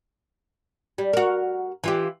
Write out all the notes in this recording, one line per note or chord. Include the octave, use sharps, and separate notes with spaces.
G3
F#4 A#4
E3 F4 G4